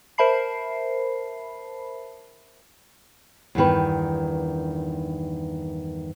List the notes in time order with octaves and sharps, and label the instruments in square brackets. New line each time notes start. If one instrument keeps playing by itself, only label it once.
[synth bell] A#4 C5 E5 A5 B5 C7
[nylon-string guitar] E2 G2 D#3 B4